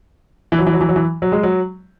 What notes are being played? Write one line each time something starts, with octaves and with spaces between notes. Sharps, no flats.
E3
F#3
E3
F#3
E3
F#3
E3
F#3
G#3
F#3